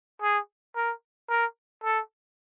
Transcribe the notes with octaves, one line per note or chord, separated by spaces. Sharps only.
G#4
A#4
A#4
A4